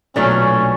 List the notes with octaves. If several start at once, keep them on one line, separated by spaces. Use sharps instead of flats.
B1 A#2 F#3 A3 C#4 D4